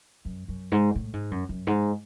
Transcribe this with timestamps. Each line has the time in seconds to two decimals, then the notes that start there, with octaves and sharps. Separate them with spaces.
0.25 F#2
0.48 F#2
0.72 G#2
0.95 A2
1.13 G#2
1.31 F#2
1.49 F#2
1.67 G#2